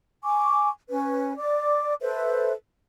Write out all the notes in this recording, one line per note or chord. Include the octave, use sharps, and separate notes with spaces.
G#5 C#6 D6
C#4 B4
D5 D6
A4 B4 C5 E5